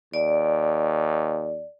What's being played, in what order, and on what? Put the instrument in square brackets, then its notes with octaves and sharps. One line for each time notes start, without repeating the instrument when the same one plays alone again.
[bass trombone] D#2 [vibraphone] D5